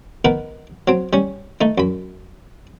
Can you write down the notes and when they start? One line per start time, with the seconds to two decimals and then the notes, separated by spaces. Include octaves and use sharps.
0.25 D#3 B3 A#4 B4
0.88 F#3 C4
1.13 G3 C#4
1.61 A3 D#4
1.78 F#2 B5